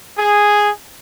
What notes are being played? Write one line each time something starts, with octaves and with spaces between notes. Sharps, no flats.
G#4